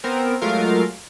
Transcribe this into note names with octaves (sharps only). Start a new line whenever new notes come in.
B3 C4 A#4
F#3 G#3 A3 F4 A#4 F5